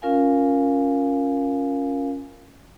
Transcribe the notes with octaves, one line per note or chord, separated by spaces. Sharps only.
C#4 F4 A#4 F5 G#5